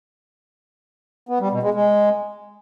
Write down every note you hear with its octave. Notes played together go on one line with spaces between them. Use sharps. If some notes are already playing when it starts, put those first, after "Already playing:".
B3
G3
B2
G#3
G#3